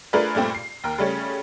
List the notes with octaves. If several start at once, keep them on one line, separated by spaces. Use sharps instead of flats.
A3 D4 F4 G#4 A#4 B4
G2 A#2 A3 C4
C7
D#2 A#4
C#3 G3 A3 C#4